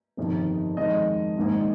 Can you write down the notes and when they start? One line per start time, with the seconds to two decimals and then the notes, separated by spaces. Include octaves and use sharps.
0.17 G1 F2 C3 D#3
0.77 F2 D#3 G#3 D#5
1.37 A#1 G#2 D#3